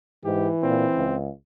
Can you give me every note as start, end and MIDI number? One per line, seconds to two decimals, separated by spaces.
0.24 0.49 44
0.24 1.11 52
0.24 0.49 67
0.63 0.85 46
0.63 1.16 60
0.95 1.29 37